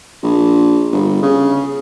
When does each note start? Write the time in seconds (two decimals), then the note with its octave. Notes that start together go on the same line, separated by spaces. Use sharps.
0.23 A#1
0.92 G1
1.23 C#3